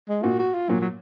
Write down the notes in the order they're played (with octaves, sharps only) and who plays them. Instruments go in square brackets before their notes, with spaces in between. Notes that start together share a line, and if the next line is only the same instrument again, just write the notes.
[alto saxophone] G#3
[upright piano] A#2 [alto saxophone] F#4
[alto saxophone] F#4
F4
[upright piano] A#2 [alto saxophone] F#3
[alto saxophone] F#3